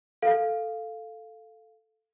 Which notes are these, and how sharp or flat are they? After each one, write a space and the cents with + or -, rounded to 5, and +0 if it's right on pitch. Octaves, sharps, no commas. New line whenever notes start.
A4 +0 F5 +0